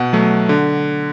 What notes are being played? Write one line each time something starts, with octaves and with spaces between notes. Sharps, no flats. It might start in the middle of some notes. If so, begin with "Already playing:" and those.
Already playing: B2 F#5
F#3 A3
D3